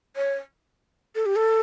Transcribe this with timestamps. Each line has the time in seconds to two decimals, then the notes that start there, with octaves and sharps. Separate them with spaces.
0.16 C#5
1.15 A4
1.26 G4
1.36 A4